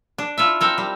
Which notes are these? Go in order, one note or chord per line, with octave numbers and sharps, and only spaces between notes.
D4
E4 F4 A4 E5
C4 A4 A#4
G3